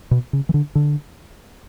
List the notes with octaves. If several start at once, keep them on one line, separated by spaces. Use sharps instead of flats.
B2
C#3
E3
D3
D3